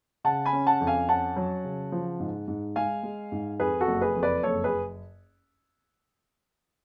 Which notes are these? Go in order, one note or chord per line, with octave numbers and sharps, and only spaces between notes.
C#3 F#5 A5
G#5 B5
C#4
F#5 A5
F2
F5 G#5
C#4 F#5 A5
F#3
C#3
F3
G#2
G#2
G#3 F5 G#5
G#3
G#2
F2 G#4 B4
F#4 A4
F#1
G#4 B4
F2
B4 D5
F#1 A4 C#5
G#4 B4